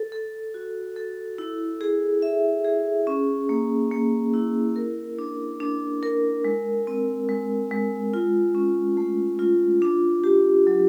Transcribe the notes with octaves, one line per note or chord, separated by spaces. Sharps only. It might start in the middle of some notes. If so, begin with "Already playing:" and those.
Already playing: A4
A4
F#4
A4
E4
G#4
E5
G#4
C#4
A#3
A#3
E4
A#4
D4
D4
A#4
G#3
C4
G#3
G#3
F4
C#4
A3
F4
D4
G4
F#3